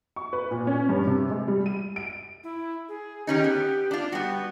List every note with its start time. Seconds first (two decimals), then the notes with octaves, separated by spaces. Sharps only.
0.16 C#6
0.33 B4
0.51 A#2
0.67 C#4
0.89 G2
1.07 C3
1.31 G#3
1.48 G3
1.66 D#7
1.96 D7
2.44 E4
2.89 G#4
3.27 D#3 C#4 D#4 G4
3.44 B3
3.91 D4 F4
4.12 G3 B3 F#4